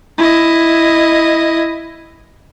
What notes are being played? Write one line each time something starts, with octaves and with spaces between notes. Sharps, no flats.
E4 D#5